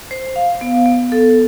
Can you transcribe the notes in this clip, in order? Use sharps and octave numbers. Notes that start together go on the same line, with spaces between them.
C5
F5
B3
B3
A4